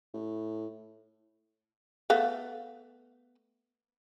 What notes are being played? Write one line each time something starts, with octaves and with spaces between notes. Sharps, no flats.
A2
A3 B3 F5